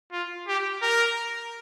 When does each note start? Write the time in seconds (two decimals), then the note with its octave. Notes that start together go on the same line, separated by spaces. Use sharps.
0.12 F4
0.48 G4
0.82 A#4